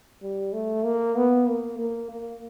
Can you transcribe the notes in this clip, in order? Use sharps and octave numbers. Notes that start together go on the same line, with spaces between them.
G3
A3
A#3
B3
A#3
A#3
A#3